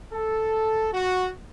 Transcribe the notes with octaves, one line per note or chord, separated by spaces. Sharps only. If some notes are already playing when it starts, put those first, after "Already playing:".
A4
F#4